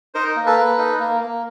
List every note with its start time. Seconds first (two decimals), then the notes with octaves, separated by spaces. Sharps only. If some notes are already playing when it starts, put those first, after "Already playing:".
0.14 D#4 A#4 C5
0.36 A#3
0.46 A4 B4
0.57 A#3
0.78 D#4
0.99 A#3
1.21 A#3